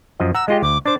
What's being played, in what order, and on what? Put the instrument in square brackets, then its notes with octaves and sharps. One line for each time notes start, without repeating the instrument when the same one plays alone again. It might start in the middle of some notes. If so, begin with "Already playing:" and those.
[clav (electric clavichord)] F#2 F3 D#5
[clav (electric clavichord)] F#5 A#5 [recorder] E6
[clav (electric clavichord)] G#3 F4 G4 [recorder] D#5
[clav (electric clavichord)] D2 [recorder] D6
[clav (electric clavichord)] D4 C5 [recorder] D6